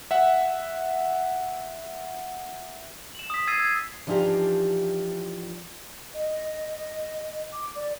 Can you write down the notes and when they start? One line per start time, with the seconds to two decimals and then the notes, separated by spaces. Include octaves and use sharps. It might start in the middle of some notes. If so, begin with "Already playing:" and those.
0.11 E5 F#5
3.15 E7 F#7
3.30 D#6 B6
3.47 E6 G#6 A6 C7 D#7
3.60 G#6
4.07 E3 F3 D4 D#4 F4 G4
6.14 D#5
7.53 D6
7.75 D5